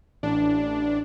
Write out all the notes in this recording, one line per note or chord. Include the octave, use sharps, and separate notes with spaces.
A1 D4